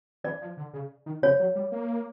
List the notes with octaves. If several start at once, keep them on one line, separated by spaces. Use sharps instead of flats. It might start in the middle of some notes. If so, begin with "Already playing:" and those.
E3 D5
F3
D3
C#3
D#3
C#3 C#5
F#3
G3
A#3